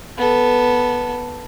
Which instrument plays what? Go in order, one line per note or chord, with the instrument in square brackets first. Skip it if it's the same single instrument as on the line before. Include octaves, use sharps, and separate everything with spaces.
[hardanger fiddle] B3 A4